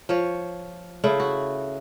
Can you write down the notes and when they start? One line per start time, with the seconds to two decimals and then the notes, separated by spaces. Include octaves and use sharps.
0.09 F3 C#5
1.04 C#3 A3 E4
1.20 F#4